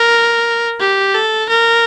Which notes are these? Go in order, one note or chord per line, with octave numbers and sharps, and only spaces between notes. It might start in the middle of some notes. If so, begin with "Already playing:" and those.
Already playing: A#4
G4
A4
A#4